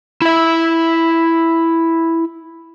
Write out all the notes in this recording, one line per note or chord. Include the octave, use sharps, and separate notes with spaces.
E4 E5